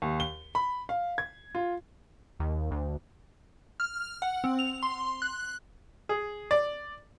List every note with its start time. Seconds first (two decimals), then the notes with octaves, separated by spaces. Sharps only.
0.02 D#2
0.20 G7
0.55 B5
0.89 F5
1.18 G#6
1.55 F4
2.40 D#2
2.71 D2
3.80 F6
4.22 F#5
4.44 C4
4.59 F7
4.83 C6
5.22 F#6
6.09 G#4
6.51 D5